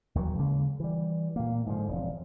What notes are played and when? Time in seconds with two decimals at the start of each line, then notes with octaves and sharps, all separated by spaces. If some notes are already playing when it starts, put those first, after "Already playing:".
0.15 D#2 D#3 E3 F#3
0.39 C#3 F#3 G#3 A#3
0.80 E3 G3
1.36 A#2 A#3
1.66 G#2 D3 F3
1.88 E1 F2